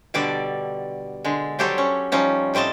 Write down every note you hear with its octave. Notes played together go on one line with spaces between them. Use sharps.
B2 D3 G3 A4 D5
D3 G#3
F#3 G3 G4 A4 C5 C#5
C#4
F3 G3 C#4 D#4
A2 G3 C4 D#5 A5